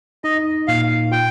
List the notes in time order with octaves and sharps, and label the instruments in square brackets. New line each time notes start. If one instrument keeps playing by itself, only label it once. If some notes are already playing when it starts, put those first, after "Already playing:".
[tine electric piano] D#4 [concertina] D#5
[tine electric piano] A#2 [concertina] F5
[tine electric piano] F4 [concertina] G5